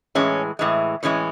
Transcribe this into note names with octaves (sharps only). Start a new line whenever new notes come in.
A2 E3 G#3 C#4
A2 E3 G#3
A2 E3 G#3 C#4